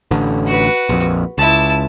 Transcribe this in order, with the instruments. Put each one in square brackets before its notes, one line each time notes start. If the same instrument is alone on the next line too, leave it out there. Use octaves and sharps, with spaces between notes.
[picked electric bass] A1 D3
[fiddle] F#4 B4
[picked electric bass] A#1 F2
[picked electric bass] C#2 [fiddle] E4 A5